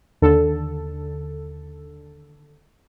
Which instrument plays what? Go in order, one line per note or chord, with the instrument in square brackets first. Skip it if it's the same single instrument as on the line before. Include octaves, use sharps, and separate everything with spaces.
[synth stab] D#2 D3 A4